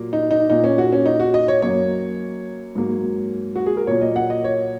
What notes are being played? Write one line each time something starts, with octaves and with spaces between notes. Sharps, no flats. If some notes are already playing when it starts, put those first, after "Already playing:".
Already playing: A#2 F#3 A#3
D#4
D#4
A#2 A#3 D#4
C#4
F#4
C#4
D#4
F#4
D#5
C#5
F#2 F#3 A#3 C#5
G#2 F#3 A#3
F#4
G#4
A#4
A#2 F#3 A#3 C#5
D#5
F#5
D#5
C#5